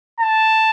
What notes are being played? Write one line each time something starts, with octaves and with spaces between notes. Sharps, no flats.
A5